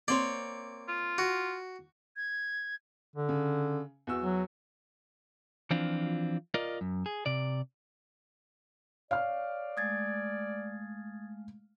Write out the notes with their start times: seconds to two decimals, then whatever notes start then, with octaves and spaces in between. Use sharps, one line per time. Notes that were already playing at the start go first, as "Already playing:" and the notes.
0.08 A#3 C4 C#5 D5
0.88 F4
1.18 F#4
2.16 G#6
3.16 D3
3.29 C#3
4.07 E2 F#4 E6
4.23 F#3
5.71 E3 F3 C4 D4 F4
6.54 F4 A#4 D5 D#5
6.81 F#2
7.06 G#4
7.26 C3 D5
9.11 C#5 D5 F5 F6
9.77 G#3 A3 D#6 G#6 A6